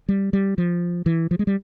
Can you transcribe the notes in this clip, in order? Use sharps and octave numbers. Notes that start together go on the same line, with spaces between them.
G3
G3
F3
E3
F3
G#3
G3